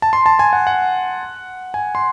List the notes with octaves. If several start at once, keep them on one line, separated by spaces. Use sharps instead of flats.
A5
C6
A5
G#5
F#5
F#5
G#5
C6